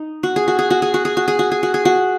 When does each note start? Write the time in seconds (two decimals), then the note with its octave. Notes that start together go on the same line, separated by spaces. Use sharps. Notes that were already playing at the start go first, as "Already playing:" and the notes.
Already playing: D#4
0.23 F#4
0.36 G#4
0.48 F#4
0.59 G#4
0.70 F#4
0.82 G#4
0.94 F#4
1.05 G#4
1.17 F#4
1.28 G#4
1.39 F#4
1.52 G#4
1.63 F#4
1.74 G#4
1.85 F#4